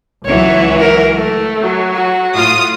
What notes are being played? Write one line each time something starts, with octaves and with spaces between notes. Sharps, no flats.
C#2 E3 F#3 C#5
A#4
A3
F#3
F#4
A2 F4 D#6